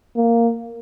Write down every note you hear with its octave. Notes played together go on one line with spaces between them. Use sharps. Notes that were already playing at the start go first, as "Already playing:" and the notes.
A#3